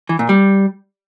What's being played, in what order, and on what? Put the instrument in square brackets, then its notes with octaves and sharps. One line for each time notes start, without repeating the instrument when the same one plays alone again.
[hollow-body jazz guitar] E3
A#2
G3